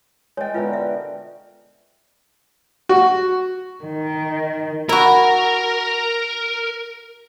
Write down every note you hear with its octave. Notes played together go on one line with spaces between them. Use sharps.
G#3 C#5 D#5 G5
B2 D3 F4 A#4 B4 E5
E5
F#4
D#3
E4 F#4 A#4